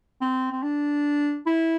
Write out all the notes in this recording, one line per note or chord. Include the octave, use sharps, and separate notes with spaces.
C4
C4
D4
E4